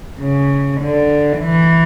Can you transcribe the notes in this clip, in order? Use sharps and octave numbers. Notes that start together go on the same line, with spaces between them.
C#3
D3
E3